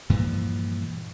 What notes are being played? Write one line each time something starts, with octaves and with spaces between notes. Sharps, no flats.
G2 A#2 E3 F3